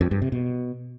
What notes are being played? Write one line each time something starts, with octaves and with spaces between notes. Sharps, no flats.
F2
G2
C3
B2